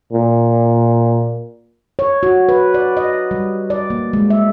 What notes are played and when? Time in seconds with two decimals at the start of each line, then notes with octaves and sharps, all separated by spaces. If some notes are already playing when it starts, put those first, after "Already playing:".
0.13 A#2
1.99 C#5
2.23 F#4
2.49 B4
2.74 D5
2.97 D#5
3.31 G3
3.70 D5
3.90 A#3
4.13 G#3
4.30 E5